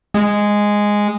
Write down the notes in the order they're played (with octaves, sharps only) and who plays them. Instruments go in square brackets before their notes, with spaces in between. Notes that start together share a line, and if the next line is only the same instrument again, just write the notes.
[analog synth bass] G#3